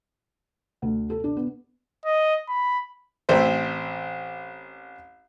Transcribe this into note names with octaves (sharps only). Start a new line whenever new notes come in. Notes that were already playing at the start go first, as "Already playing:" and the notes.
D2
A4
D4
B3
D#5
B5
A1 A2 C4 C5 E5